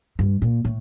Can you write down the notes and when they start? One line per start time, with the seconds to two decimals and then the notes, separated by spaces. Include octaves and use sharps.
0.19 G2
0.42 A#2
0.65 A2